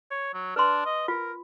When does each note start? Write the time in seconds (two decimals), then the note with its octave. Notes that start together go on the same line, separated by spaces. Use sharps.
0.11 C#5
0.34 F#3
0.56 D4 B4 C6
0.85 D#5
1.08 F4 A#4